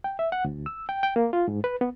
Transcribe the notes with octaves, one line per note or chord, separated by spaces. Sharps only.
G5
E5
F#5
D2
E6
G5
G5
A#3
F4
G#2
B4
B3